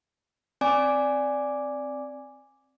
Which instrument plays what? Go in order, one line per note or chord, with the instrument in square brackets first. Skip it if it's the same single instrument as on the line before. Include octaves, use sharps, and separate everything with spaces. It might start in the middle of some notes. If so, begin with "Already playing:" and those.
[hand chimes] C4 D5 G#5 D6